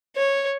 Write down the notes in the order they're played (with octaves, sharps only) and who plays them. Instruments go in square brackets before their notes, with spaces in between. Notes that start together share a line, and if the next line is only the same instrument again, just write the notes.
[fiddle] C#5